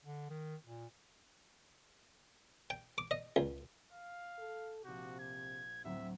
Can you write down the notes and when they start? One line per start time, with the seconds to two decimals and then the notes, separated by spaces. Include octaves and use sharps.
0.04 D3
0.30 D#3
0.65 A#2
2.70 G5
2.98 D6
3.11 D#5
3.36 C#2
3.93 F5
4.38 A4
4.85 A#1 C3 F#4 D6 G6
5.19 G#6
5.85 D2 A2 F#3 C4 E5